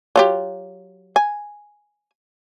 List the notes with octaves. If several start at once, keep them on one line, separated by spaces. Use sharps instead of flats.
F#3 F4 G4
G#5